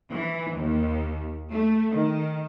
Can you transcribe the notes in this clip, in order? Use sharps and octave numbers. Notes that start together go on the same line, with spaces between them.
E3
D#2
A3
D#3